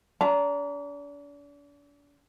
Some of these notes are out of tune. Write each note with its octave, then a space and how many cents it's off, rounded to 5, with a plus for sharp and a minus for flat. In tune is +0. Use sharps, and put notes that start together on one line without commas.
D4 -40 A#5 +0